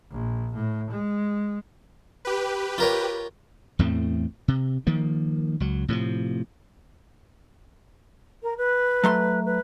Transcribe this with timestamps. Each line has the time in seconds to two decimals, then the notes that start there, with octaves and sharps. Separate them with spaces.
0.11 A#1
0.55 A2
0.91 G#3
2.25 G4 B4
2.78 F4 A#4 C#5
3.79 E2 A2 A3 C4
4.48 C3
4.87 D#3 F3 A#3
5.60 C#2 F#3
5.88 A2 C3 D#3 F3
8.43 A#4
8.58 B4
9.04 F#3 A3 C6
9.46 B4